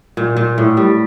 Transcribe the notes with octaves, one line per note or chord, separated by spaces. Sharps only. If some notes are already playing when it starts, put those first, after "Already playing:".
A#2
A#2
A2
G3